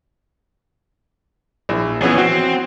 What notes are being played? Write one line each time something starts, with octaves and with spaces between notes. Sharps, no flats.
A#1 E4
E3 F3 B3 C#4 G#4
C4 F#4